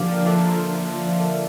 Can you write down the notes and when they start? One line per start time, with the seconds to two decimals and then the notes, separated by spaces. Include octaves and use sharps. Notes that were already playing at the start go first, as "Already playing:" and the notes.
Already playing: D3 F3 A#3 D4 G4 D5 F5
0.26 A#3 D4 F4 A4 E5